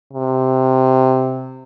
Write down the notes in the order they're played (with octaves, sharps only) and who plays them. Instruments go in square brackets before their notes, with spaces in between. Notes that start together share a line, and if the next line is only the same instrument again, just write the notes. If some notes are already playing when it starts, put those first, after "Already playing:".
[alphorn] C3